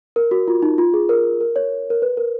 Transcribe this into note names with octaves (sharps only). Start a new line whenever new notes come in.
A#4
F#4
F4
D#4
F4
G#4
A#4
A#4
C#5
A#4
B4
A#4